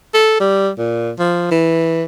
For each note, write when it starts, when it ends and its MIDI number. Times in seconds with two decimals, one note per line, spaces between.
0.14 0.36 69
0.40 0.69 55
0.78 1.11 46
1.19 1.46 53
1.51 2.04 52